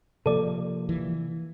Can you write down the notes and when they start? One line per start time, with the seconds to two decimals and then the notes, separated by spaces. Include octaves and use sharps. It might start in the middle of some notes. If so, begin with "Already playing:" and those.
0.26 C3 F3 A#3 A4 D5
0.89 E3